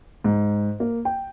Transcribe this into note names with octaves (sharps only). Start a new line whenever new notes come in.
G#2
A#3
G5